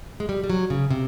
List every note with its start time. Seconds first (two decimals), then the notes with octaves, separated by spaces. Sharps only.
0.20 G#3
0.29 G3
0.44 G3
0.50 F#3
0.70 C#3
0.91 C3